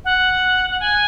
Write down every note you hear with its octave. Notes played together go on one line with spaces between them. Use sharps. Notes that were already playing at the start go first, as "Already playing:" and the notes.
F#5
F#5
G#5